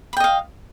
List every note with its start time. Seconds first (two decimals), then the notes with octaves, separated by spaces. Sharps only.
0.13 B5
0.17 G5
0.20 D#5
0.24 F5